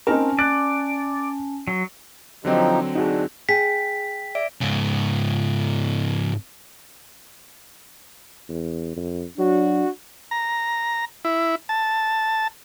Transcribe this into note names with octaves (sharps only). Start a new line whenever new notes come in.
C4 C#4 D#4 A#4 G#5 A5
D5 F#6
F#3
D3 F3 F#3 C4 D#4 G4
D4 D#4 F#4 G#4
G#4 G5 B6
D5 E5 D7
G#2 C#3
E2
F2
F#3 D4 F#4
A#5
E4
A5